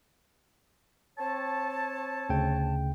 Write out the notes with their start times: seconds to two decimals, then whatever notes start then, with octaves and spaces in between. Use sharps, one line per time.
1.18 C4 C#5 A5
2.29 D2 C#3 G5